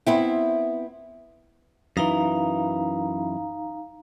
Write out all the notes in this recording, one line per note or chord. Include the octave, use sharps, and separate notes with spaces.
B3 C4 E4
F#2 E3 D#4 F5 A#5